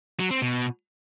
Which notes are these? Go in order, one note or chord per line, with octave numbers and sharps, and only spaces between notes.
F#3
C4
B2